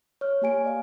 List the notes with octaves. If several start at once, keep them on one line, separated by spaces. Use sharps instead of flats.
C#5 F6
A#3 G4 G#5 D7
D5 D#5 F5